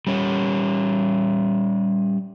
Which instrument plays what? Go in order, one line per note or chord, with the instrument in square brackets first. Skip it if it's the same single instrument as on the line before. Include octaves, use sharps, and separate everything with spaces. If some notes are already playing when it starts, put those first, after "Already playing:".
[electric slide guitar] G3 C#4